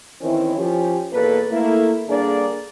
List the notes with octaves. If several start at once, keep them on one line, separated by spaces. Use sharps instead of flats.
D#3 E3 C4 C#4 E4
F3 C#4 G4
E2 B2 A#3 A4 B4
A3 A#3 E4
G2 D3 A#3 D4 G#4 D5